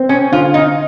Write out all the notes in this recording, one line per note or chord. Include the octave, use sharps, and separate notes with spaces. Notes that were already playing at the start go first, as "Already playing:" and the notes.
Already playing: C4
C#4
D3 F4
D#4